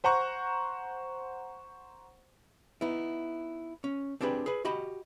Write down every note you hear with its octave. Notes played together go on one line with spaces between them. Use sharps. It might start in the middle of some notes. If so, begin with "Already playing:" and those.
C5 F#5 A#5 C#6
B3 D#4 E4
C#4
C4 D4 G4 G#4 B4
G#4 B4
F#4 G4 D#5 B5